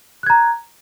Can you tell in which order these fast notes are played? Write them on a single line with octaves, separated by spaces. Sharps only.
F#6 G#6 A#5